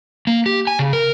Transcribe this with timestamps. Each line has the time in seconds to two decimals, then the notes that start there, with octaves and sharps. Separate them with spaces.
0.27 A#3
0.46 G4
0.67 G#5
0.79 C#3
0.93 A#4